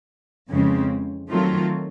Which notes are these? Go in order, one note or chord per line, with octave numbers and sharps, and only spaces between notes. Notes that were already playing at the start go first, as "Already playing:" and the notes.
F2 C#3 E3 G#3 C4
D#3 F#3 A3 C4 F4